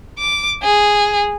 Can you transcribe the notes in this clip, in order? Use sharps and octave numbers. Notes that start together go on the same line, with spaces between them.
D6
G#4